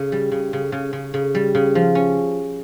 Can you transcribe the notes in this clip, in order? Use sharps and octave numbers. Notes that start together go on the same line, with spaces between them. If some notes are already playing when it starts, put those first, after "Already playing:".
Already playing: C#3
G3
C#3
C#3
C#3
C#3
C#3
G3
C#3
F3
C#4